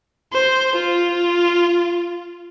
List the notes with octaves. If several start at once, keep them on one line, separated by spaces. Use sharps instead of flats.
C5
F4